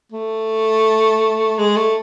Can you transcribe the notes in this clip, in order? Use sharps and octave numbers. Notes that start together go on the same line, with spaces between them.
A3
G#3
A3